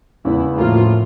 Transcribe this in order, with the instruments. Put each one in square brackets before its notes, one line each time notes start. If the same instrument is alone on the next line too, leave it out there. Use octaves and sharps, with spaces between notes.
[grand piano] E2 C#3 E3 G#3 B3 [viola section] E4
[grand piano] A2 F3 A#3 [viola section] F4